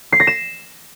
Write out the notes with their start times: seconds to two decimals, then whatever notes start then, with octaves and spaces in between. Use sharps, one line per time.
0.12 C7
0.20 A#6
0.27 E7